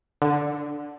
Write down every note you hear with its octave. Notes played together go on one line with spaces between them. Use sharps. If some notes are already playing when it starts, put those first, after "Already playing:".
D3